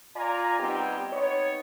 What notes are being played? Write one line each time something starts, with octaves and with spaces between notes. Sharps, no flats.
F4 D5 G#5 A#5
G3 B3 C4 D#4 G4
B3 D#4 C#5